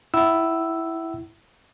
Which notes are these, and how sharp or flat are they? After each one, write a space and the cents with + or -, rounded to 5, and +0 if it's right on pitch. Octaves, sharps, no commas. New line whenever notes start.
E4 +0 F#5 +40 E6 +0